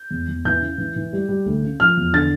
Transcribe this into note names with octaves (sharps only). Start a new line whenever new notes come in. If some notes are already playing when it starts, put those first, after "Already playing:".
Already playing: G6
E2
E2
E3 G6
C#3
E3
E3
G3
G3
D2
C#3
F3 F6
E2
D3 A6